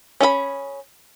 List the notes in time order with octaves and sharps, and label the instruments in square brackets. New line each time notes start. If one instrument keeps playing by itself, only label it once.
[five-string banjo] C#4 G#4 E5 B5